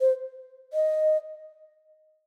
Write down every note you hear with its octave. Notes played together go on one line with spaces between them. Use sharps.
C5
D#5